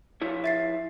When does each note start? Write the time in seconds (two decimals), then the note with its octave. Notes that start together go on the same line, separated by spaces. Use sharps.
0.22 F3 E4 C#5
0.44 E5 A6 C7